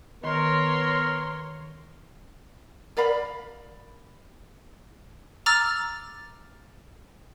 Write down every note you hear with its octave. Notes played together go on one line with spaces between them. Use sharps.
D#3 B3 A#4 C#5 C6
A#4 D5 F5 B5
A#5 D6 E6 F6 A6